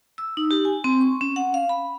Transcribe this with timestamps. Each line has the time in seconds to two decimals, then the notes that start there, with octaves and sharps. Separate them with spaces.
0.18 E6
0.37 D#4
0.51 G4
0.65 G#5
0.84 C4
1.01 C#6
1.21 C#4
1.36 F#5
1.54 F5
1.69 B5